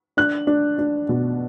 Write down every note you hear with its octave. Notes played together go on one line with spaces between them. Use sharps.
D4 F#6
D4
D4
B2